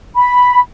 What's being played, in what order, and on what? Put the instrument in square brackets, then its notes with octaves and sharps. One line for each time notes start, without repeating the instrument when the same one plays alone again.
[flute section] B5